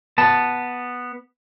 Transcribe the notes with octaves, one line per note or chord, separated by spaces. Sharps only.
B3 A5